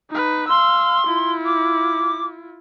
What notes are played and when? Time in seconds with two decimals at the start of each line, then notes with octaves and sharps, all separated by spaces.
0.10 D#4 B4
0.49 F5 C6 E6
1.07 E4 F4
1.45 D6